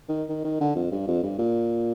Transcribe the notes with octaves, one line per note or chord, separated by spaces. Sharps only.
D#3
D#3
D#3
D3
F2
G2
F2
G2
A#2